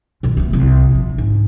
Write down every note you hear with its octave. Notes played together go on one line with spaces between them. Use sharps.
B2 D#3
A3 B3
C2
A#1 F3
G#2